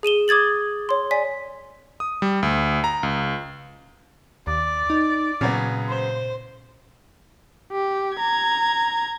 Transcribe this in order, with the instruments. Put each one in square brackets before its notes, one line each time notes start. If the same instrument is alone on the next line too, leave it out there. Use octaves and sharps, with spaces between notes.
[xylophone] G#4 D#7 E7 G7
D6 D#6 G#6 A6 F#7
C#5 C6
D5 G#5 B6
[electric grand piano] D#6
G3
D2
A#5
C#2
[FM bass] D#2 [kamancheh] D5
[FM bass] D#4
[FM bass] A#2 [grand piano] C#3 F#3 B3
[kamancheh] C5
[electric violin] G4
A#5 G#6